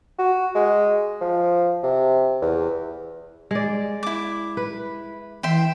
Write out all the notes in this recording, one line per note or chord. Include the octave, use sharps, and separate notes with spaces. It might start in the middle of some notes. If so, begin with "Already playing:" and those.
F#4
G#3
F3
C3
E2
G#3 D5
E4 D6
B4
E3 E5 G5 C6